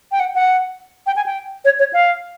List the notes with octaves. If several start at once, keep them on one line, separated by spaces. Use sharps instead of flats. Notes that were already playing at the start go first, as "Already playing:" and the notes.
G5
F#5
F#5
G5
G#5
G5
C#5
C#5
F5